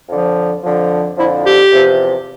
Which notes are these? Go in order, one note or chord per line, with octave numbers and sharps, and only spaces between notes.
F2 D3 F3
F2 D3 F3
F2 D3 F3 E4
G4
E2 C3 F3